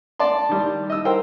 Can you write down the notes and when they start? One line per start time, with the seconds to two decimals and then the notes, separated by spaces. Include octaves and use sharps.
0.19 D5 A5 C6
0.49 D#3 G3
0.90 D#5 E6
1.05 A#4 C5 G5